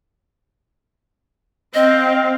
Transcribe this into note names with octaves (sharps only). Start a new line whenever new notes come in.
C4 D#5 F5